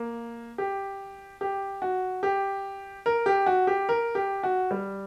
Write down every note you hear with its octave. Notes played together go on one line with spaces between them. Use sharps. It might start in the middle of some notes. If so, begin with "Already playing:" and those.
Already playing: A#3
G4
G4
F#4
G4
A#4
G4
F#4
G4
A#4
G4
F#4
G3